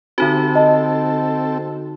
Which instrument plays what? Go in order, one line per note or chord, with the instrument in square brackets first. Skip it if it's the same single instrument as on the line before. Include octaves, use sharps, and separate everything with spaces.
[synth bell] D3 D#4 F#4 [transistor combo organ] C4 A4
[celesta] D#5 A5